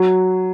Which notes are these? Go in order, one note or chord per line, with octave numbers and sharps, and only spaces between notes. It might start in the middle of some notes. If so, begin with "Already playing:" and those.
Already playing: F#3